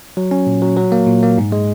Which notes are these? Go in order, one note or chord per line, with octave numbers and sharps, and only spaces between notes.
F#3
C#4
A#2
F#3
F#3
A#3
A#2
A#3
G#2
G#3